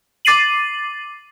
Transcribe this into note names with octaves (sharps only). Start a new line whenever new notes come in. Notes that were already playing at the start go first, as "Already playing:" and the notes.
D6 A6 C7 D#7 F#7